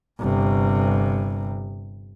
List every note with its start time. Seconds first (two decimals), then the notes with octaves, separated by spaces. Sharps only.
0.20 G1 C3